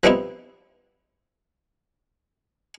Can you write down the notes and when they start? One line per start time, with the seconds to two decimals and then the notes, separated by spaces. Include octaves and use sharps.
0.03 F3 G3 B3 C4 D#4 E4